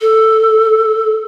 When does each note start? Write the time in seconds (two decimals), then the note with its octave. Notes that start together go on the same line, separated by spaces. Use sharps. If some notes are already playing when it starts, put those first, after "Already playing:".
0.01 A4